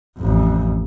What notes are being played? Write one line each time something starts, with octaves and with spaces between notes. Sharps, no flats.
A1 F2